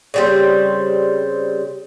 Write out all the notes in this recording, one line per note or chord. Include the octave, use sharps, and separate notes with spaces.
C#3 G3 C4